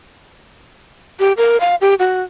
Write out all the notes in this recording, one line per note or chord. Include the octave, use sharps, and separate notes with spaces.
G4
A#4
F5
G4
F#4